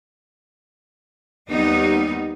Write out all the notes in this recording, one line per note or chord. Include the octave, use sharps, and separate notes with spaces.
D#2 G3 B3 D#4